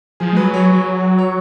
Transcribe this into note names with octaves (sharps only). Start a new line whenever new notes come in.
F3 G#4
G#3
F#3 B4
F#3 C#5
F#3
C#5